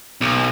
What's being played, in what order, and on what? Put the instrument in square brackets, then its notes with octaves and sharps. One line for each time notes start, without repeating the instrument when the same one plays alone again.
[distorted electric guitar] B1